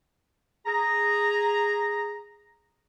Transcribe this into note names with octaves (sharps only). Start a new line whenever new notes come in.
G#4 A#5